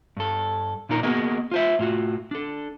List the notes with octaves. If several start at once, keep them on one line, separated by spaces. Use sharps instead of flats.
G2 A4
A#2 D4 D#4 A#4
A#3 B3 F#4 G#4 A#4 D#5
F4 C5 E5
A2 F4 F#4
D4 A4